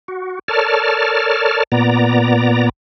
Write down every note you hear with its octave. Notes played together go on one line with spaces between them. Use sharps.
F#4
A4 A#4 C#5 D5 A5 F6
A#2 B3 D5 A#5